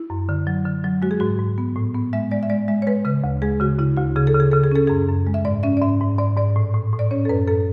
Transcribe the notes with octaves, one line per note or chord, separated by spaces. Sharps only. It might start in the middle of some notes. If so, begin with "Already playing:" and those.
Already playing: E4
F#2
D3
F#3
D3
F#3
G#3 F#4
G#4
G#2 F#4
G#2
B3
A2
B3
G#3 E5
G#3 D5
E5
G#3 D5
G#3 E5
C#5
G#3 B4
C#3 B4
D2
G#3 G#4
C#3 F#4
C#3 E4
D2 F#4
C#3 G#4
A4
C#3
G#4
C#3 A4
G#4
C#4 A4
F#2 G#4
F#2
G#3
E5
G#2 D5
C#4 E5
D5
G#2 E5
G#2
G#2 D5
G#2 D5
A2
A2
A2
D5
C#4 C#5
A4
F#2 B4
F#2 A4